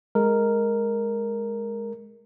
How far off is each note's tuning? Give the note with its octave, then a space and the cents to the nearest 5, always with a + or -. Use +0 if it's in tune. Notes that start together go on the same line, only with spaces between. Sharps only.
G#3 +0 A#4 -5